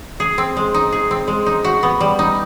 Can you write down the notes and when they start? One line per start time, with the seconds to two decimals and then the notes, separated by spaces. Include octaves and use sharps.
0.20 G#4
0.38 C4
0.57 G#3
0.74 D#4
0.92 G#4
1.11 C4
1.28 G#3
1.46 D#4
1.64 F#4
1.83 B3
2.00 G3
2.19 D#4